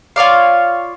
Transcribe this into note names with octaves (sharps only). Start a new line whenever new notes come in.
F4 C#5 D5 F5